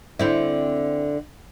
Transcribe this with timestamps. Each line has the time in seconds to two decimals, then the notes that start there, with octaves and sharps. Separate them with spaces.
0.19 D3 C4 E4